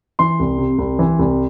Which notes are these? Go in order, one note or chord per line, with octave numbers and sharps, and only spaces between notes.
E3 C6
C2
C3
C2
E3
C2